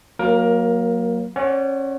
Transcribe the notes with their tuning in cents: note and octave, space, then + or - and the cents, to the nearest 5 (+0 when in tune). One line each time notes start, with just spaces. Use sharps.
F#3 -15 A#3 +0 A#4 +20
C#4 -25 D5 -45 F#5 +20